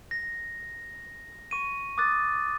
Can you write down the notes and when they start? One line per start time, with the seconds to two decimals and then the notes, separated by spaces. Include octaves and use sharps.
0.11 A#6
1.51 C#6 D#7
1.98 D6 D#6 F#6 A6